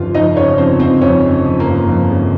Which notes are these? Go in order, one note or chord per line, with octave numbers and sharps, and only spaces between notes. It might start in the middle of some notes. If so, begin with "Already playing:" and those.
Already playing: G1 F2 C#3 F3 F4 F5
F2 D#4 D#5
C#3 C#4 C#5
F3 C4 C5
G1 C4 C5
F2 C#4 C#5
C#3
F3
A#3 A#4
G1
F2
C#3